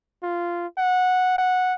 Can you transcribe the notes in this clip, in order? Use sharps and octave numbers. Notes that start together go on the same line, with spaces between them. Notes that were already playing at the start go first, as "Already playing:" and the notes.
F4
F#5
F#5